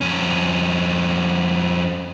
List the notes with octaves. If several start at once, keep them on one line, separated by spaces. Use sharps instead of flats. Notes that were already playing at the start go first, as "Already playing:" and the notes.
F2 C#4